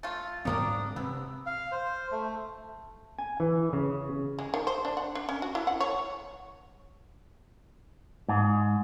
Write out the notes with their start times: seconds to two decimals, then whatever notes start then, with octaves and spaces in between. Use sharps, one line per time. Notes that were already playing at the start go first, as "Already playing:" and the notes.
0.03 A3 F4 A6
0.45 G#2 D#3 G3 A#3 C4 D4 D#6
0.96 C3 B3 E6
1.46 F5
1.72 C5
2.12 A3
3.19 G#5
3.40 E3
3.73 C#3
4.39 G#3
4.54 D#3
4.67 C5
4.85 D4
4.97 F#5
5.15 D4
5.29 C#4
5.42 F#4
5.55 E4
5.67 F#5
5.80 C#5
8.29 G#2